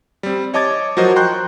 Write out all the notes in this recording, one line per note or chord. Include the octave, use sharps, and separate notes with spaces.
G3 C4
C#5 D#5 A5 D6 G#6 A6
F3 F#3 F#4 A#4 C5 D#5
G5 A#5 C6 C#6 F#6 G6